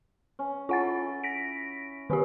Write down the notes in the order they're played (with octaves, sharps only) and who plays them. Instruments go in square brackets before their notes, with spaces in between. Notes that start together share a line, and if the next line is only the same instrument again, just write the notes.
[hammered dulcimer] C#4
[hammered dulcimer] C#4 E4 [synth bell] F4 F#5 A6
[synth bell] A#6 B6 D7
[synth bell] D#3 G4 [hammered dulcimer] B3 C#4